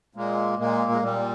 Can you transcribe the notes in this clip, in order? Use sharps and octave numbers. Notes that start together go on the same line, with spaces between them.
A#2 G#3 A#3
A#2 G#3 A#3
G#3
A#2 G3